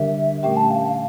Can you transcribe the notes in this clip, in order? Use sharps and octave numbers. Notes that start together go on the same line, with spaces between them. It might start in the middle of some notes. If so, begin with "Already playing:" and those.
Already playing: D3 G3 D4 G4 A#4 E5
A#2 A3 C#4 G4 A#4 G5
A5
F5
F5